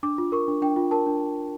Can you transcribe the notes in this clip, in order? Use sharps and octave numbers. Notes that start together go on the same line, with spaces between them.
D4 D6
F4
A#4 C#6
D4
D4 G5
F4
A#4 A5
D4